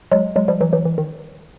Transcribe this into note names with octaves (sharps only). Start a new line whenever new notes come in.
F#3 G#3
F#3 G#3
F3 G3
E3 F#3
E3 F#3
E3
D#3